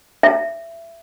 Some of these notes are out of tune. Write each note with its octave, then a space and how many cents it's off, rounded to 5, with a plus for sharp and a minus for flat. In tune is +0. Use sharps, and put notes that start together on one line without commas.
E5 +20